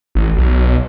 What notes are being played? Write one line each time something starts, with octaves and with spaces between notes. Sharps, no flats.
A1
B1